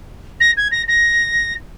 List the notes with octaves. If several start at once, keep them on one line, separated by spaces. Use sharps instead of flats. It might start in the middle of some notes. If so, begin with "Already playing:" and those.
A#6
G#6
A#6
A#6